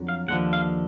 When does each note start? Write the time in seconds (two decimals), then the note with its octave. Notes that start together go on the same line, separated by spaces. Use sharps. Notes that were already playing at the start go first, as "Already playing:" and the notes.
Already playing: F2 D3 F#3
0.09 F5
0.28 D#2 D3 F3 F#5
0.53 F5